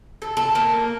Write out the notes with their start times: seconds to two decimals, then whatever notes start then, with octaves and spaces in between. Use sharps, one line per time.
0.22 A4
0.37 A4
0.55 A#3